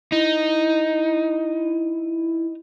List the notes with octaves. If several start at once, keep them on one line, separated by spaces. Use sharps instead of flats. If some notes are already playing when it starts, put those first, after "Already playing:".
D#4 E4